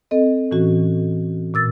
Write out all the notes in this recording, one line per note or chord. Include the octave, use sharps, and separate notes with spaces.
C4 A4 D#5
A2 E3 C#4 F#4
A#2 E6 A6